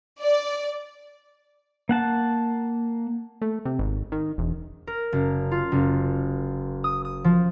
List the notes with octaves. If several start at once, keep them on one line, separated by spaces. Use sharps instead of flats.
D5
A#3 F#5 A5
A3
C3
G#1
D#3
E1
A#4
F#1
F4
F#1
D#6
D#6
F3